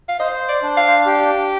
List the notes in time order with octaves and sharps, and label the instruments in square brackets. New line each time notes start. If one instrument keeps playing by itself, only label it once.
[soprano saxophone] F5
[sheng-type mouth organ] C5 [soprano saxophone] D#5
[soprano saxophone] D5
[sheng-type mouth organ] D4
[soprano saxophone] F5
[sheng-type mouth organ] G4